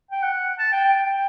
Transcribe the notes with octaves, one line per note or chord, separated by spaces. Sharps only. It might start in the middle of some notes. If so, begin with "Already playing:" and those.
G5
F#5
A5
G5
G5
G5